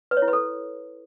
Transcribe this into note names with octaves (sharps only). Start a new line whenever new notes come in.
B4
C#5
E4
B4
A4